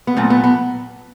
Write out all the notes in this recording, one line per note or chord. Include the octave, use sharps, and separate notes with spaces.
B3
A#2 F#3 A3 C4
B3
B3